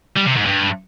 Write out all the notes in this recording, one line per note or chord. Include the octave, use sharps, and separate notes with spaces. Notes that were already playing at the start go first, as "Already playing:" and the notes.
G3
C3
G#2
G2